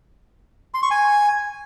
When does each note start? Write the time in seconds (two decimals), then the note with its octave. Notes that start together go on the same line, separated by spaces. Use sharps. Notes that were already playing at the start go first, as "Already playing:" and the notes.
0.74 C6
0.83 C#6
0.91 G#5